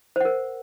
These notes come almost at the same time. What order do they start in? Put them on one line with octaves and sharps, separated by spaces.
C5 F#5 A#4